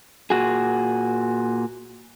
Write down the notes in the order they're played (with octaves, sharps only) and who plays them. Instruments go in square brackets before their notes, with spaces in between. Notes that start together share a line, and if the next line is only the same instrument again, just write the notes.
[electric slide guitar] A#2 F#4 G#4